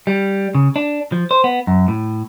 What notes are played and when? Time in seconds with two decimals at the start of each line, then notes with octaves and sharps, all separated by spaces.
0.07 G3
0.55 C#3
0.76 D4
1.12 F3
1.31 C5
1.44 B3
1.67 F#2
1.88 A2